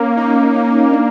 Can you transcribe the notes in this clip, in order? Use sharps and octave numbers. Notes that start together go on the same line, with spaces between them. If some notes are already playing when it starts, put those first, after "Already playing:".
Already playing: A#3 C#4
D#4
D4